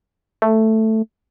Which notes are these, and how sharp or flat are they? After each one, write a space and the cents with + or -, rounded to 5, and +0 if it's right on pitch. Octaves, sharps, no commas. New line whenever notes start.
A3 +5